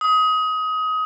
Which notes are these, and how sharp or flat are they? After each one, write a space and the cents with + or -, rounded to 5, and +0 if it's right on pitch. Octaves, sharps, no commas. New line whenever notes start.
D#6 +25